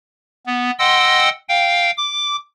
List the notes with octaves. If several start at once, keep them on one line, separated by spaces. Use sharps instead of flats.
B3
D#5 F#5 G5 C6 E6
F5 G5
D6